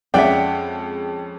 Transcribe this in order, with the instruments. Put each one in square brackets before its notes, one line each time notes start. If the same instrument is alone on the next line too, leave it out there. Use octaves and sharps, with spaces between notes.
[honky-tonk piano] F2 G#3 C#4 [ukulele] D5 E5 [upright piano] F#5 G5